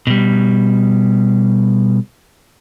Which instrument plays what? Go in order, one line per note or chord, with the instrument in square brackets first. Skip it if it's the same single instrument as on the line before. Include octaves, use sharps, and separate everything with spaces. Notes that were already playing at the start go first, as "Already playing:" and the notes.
[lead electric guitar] B2 G3